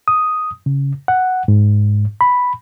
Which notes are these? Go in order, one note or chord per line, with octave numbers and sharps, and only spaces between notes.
D#6
C#3
F#5
G#2
B5